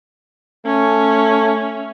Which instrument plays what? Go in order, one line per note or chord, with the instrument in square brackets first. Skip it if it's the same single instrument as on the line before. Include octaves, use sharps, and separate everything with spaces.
[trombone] A3 [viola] C#4